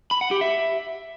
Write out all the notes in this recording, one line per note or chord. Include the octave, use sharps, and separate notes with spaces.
B5
F#5
G4
E5